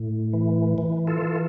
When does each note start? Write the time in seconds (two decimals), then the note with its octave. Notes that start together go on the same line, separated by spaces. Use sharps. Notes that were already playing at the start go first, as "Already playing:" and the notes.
Already playing: A2
0.33 E3
0.78 E3
1.07 F4 A4
1.22 E3